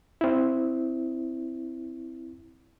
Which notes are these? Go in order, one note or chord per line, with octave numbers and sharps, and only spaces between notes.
C4 E4